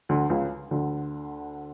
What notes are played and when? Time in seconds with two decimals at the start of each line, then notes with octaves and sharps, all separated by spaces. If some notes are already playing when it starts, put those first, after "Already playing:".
0.09 D2 D3
0.30 C#2 C#3
0.71 D2 D3